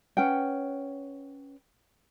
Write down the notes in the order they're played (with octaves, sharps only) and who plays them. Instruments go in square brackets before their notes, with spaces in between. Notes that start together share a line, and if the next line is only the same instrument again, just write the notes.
[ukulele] C#4 B4 F#5 G5